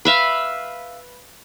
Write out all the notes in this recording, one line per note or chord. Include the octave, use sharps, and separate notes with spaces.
B4 E5 F5